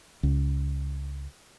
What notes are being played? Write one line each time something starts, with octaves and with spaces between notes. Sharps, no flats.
C#2